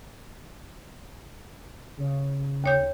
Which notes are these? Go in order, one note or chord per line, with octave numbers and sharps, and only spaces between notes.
C#3
D#2 C#5 G6